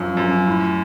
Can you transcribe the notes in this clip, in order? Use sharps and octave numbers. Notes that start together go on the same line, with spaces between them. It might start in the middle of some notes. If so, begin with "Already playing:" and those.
Already playing: F#2 F3
F#2
A2